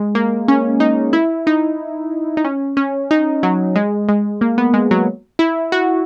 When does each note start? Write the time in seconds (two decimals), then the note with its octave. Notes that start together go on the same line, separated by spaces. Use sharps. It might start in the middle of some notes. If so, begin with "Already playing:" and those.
Already playing: G#3
0.15 A#3
0.48 C#4
0.80 D#4
1.13 E4
1.47 D#4
2.37 D#4
2.44 C#4
2.77 C#4
3.11 D#4
3.43 F#3
3.76 G#3
4.09 G#3
4.41 A#3
4.58 B3
4.74 G#3
4.91 F#3
5.39 E4
5.72 F#4